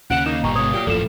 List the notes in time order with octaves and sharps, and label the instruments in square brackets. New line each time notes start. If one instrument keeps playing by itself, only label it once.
[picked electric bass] D#2 [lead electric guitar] C#3 C#4 [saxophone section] F#5 [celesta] D7 E7
[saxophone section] A#3 D#4 [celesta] E7
[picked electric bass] G1 [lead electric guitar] A#2 G3 [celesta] A#5 C#6
[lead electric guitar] B2 G#3 [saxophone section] C#5 [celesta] D#6
[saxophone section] A#2 F#3 [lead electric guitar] G4
[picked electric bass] D#1 F#2 [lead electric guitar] A2 F3 [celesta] A4 E7